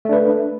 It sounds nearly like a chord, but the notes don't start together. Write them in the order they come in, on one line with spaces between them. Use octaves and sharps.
A3 D4 B4